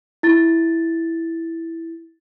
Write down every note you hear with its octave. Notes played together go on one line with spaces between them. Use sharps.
E4 A6